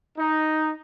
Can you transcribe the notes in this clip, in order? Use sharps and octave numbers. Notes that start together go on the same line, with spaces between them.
D#4